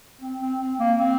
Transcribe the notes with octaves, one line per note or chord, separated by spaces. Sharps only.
C4
C4
C4
A#3
C4